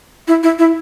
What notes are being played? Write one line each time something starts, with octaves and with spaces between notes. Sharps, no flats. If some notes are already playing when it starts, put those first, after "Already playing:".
E4
E4
E4